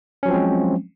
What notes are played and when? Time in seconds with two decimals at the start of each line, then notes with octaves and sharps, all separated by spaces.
0.23 C#4
0.26 F#3
0.28 F3
0.31 C4
0.34 G#3